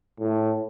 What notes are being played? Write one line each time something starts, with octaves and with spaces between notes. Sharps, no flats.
A2